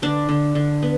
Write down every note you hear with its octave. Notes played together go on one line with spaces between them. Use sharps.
D3 D4
D3
D3
B3